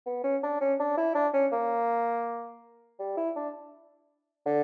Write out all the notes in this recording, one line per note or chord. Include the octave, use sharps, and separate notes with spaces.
B3
C#4
D4
C#4
D4
E4
D4
C#4
A#3
G3
E4
D4
D3